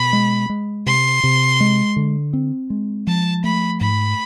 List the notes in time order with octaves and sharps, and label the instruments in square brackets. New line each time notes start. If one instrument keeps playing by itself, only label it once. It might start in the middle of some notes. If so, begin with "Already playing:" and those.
Already playing: [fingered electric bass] B2 [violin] B5
[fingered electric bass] G#3
G#3
[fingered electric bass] C3 [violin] C6
[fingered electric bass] C3
G#3
D3
C4
G#3
[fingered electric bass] F3 [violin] A5
[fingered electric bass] A3 [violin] B5
[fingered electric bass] G#2 [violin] B5